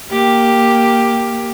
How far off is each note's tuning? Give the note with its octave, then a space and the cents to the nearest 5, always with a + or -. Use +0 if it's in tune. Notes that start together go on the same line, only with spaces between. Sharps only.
A#3 +0 G4 +0